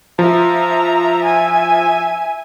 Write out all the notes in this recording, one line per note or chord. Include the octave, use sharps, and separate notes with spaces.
F3 E5 A#5
E5 G#5